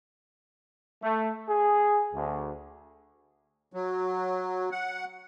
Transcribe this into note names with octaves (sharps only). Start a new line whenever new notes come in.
A3
G#4
D2
F#3
F#5